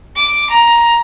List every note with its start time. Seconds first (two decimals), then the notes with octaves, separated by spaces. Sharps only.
0.16 D6
0.50 A#5